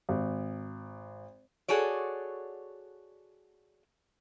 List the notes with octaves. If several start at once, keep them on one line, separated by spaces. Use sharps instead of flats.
G#1
F#4 G#4 A4 C#5 D5